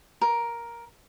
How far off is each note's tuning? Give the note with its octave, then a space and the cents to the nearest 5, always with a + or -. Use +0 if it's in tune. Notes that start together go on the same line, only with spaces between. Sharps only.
A#4 +10